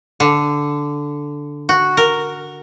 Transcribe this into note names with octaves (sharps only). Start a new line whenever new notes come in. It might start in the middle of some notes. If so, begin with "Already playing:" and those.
D3
F#4
A#4